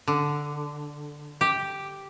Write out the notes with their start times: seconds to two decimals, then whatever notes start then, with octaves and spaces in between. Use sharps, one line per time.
0.08 D3
1.41 G4